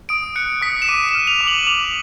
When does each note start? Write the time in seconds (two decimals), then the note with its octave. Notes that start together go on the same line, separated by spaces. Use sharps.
0.09 D#6 D7
0.36 F#6 C#7
0.62 D#6 B6
0.82 E7
0.88 D6 D#7
1.09 E7
1.15 F6
1.27 F7
1.41 D6
1.47 F#7
1.67 D6 F7